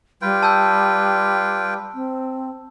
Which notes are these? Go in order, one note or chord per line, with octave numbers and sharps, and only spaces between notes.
G3 F4 B4 G5
A5 E6 G6
C4